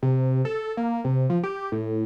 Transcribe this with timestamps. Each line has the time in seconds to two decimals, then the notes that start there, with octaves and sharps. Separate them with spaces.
0.03 C3
0.45 A4
0.77 A#3
1.04 C3
1.30 F3
1.44 G4
1.72 A2